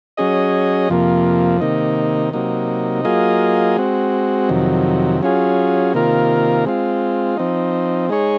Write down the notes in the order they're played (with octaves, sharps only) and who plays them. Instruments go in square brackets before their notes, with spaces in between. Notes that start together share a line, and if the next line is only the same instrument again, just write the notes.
[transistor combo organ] F#3 C#4 G#4 D#5
F2 C3 F3 A#3
C3 D#3 A#3 D#4
C3 F#3 A#3 D#4
F#3 A#3 F4 G#4 D#5
G#3 C4 F#4
F2 C3 D#3 F#3
F#3 C#4 F4 G#4
C3 D#3 A#3 F4 A#4
G#3 C4 F4
F3 C4 D#4
G#3 D#4 G#4 C#5